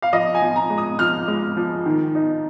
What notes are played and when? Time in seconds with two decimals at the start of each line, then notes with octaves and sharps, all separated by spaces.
0.02 F5
0.13 F3 D#5
0.35 G#5
0.42 F3
0.56 A#5
0.70 G#3
0.78 D#6
0.99 F3 F6
1.28 G#3
1.57 F3
1.86 D#3
2.15 D#4